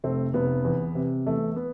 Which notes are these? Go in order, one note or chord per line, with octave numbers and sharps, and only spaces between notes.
F1 A3 C4
F1 B3
E2
C3
E2 A3
B3